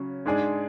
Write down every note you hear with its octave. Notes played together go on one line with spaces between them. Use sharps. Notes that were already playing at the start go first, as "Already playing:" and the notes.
Already playing: C#3 F#3 C#4
G#2 G#3 D4 G#4 D5